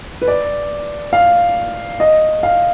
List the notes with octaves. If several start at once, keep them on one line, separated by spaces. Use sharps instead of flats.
B4
D5
F5
D#5
F5